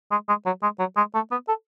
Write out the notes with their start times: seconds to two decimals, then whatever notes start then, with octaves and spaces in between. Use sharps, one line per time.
0.11 G#3
0.28 G#3
0.46 F#3
0.63 G#3
0.79 F#3
0.97 G#3
1.14 A3
1.31 B3
1.48 A4